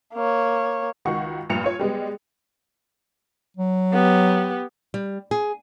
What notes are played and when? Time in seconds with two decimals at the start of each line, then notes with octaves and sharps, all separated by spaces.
0.14 A#3 C#5
1.05 C#2 D#3 F#4 C#6
1.49 F1 G2 A#2 C#7 F7
1.64 F4 C#5
1.79 G3 G#3 B3
3.57 F#3
3.93 B3 G4
4.94 G3
5.31 G#4